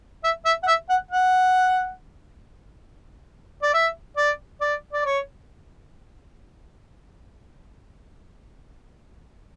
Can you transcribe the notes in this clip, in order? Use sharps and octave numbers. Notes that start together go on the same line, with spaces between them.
E5
E5
F#5
E5
F#5
F#5
D5
E5
D5
D5
D5
C#5